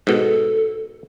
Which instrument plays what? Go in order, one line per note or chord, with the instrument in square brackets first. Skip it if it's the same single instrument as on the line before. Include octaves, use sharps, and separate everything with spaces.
[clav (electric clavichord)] G#2 B2 [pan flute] A4